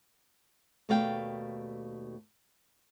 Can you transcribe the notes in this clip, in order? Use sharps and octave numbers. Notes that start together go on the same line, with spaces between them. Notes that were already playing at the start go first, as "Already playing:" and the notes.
D#2 B2 A3 D5 F5 G5